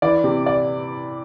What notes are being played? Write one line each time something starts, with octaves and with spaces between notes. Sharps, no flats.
E3 D5
C3
D5